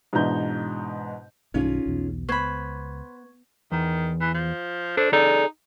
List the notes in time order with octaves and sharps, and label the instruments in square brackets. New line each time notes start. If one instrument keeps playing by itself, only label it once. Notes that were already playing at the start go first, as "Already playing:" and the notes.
[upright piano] G#2 B2 E3 D4 A#5 G6
[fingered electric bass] B1 G2 D#3 [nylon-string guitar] C#4 F4 G#4 [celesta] D#4
[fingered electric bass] B1 E2 B2
[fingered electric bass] C#2 [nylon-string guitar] B3 [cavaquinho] C5 B5 [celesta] C#6 G#6
[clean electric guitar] E2 [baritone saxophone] D#3
[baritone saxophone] E3
F3
[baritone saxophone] D4 [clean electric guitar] A4 C5
[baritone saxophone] D#4 [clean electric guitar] G#4 A4 D5